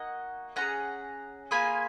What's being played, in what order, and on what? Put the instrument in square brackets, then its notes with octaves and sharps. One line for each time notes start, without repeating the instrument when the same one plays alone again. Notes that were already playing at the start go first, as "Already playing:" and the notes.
Already playing: [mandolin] A#3 D#4 F#4 D#5 F#5
C#4 F4 F#5 A#5
G#4
A#3 F4 G#4 G#5 B5